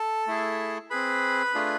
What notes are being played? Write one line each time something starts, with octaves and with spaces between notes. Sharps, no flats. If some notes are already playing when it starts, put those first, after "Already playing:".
Already playing: A4 A5
A3 E4 G#4
C4 G#4 B4 B5
A3 D4 F4 G#4